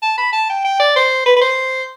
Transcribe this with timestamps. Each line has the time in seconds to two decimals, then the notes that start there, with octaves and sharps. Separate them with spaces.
0.02 A5
0.18 B5
0.33 A5
0.50 G5
0.65 G5
0.80 D5
0.96 C5
1.26 B4
1.36 B4
1.41 C5